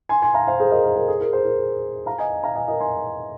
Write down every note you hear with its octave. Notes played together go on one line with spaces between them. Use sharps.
G#5 C6
G#5 C6
F5 A#5
C5 F5
G#4 C5
A#4 D#5
A#4
A#4
G#4
A#4
G#4 C5
A#4
F5 A#5
D#5 G#5
F5 A#5
D#5 G#5
A#4 D#5
G#5 C6